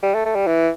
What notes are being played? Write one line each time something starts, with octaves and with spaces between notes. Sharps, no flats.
G3
A3
A3
G3
E3